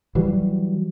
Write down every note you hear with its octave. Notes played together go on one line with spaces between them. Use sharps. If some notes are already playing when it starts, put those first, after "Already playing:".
E3 F#3 G3